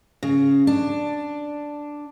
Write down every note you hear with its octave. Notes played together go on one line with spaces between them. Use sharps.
C#3
D4